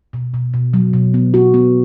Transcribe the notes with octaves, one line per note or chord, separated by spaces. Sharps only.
B2
B2
B2
F#3
B2
B3
F#4
B3